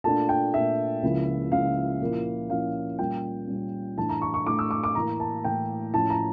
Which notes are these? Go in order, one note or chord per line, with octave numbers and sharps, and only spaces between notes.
A#2 A3 D4 F4 A5
G5
A#2 A3 D4 F4 E5
C#2 C#3 F3 A#3 E4
C#2 C#3 F3 A#3 E4 F5
A#2 F3 A#3 C#4 E4
A#2 F3 A#3 C#4 E4 F5
A#2 G3 C#4 G5
A#2 G3 C#4
A2 E3 A3 D4 A5
A#5
C#6
C#6
A2 E3 A3 D4 D6
E6
D6
D6
A2 E3 A#3 A#5
A5
A2 E3 A#3 G5
A2 F3 C#4 E4 A5
A#5